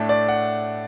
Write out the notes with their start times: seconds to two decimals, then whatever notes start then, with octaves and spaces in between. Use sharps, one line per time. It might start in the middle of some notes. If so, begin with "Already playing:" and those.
Already playing: A2 A3 D4
0.09 D5
0.29 F#5